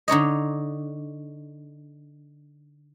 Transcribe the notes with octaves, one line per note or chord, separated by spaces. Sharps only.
D3 D#4 C#5 D#5